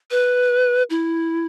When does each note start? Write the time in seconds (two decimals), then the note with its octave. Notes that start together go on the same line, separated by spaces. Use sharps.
0.11 B4
0.90 E4